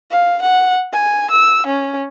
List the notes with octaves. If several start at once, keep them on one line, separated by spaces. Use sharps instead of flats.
F5
F#5
G#5
E6
C#4